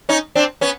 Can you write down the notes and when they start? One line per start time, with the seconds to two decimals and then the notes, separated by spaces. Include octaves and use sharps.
0.09 C#4 D#4
0.35 C4 D4
0.61 B3 C#4